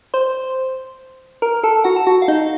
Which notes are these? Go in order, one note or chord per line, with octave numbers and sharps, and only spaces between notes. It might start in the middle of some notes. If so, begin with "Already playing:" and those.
C5 C6
A#4 A#5
A4 A5
F#4 F#5
A5
F#4 F#5
F5
D#4 D#5